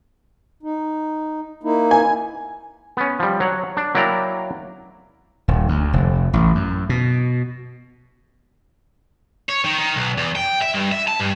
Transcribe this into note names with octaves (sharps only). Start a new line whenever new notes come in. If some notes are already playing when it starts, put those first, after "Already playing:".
D#4
A#3 D#4 E4
G#5
B3 C#4
F3 G3
F#3 C#5 F#5
D4
F#3 A#3 E4 D5 G5 A#5
D#1
D2
F1
A1
F#2
B2
C#5
D#3
D#3
B1
E2
G5
E5
G2
E5
A5
G2